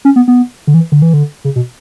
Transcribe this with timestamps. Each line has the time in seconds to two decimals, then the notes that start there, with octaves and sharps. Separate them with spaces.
0.05 C#4
0.16 B3
0.28 B3
0.67 D3
0.74 E3
0.92 D3
1.02 E3
1.14 D3
1.45 C#3
1.56 B2